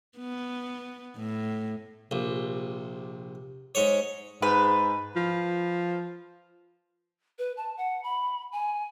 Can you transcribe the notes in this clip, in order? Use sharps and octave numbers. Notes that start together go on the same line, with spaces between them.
B3
A2
A#1 C3
G#2 C#5
G#2 B4
F3
B4
A5
F#5
B5
G#5